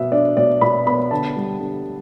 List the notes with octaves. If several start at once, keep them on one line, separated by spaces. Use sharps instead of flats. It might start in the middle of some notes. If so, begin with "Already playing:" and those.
Already playing: B2 B3 E5
D4 D5
B2 D5
B2 B5
B3 B5
D3 A5
G3
D3